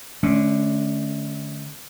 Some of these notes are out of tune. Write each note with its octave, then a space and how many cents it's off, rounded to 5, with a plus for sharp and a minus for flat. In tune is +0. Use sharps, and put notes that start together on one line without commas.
D3 +0 A3 -35 C#4 +20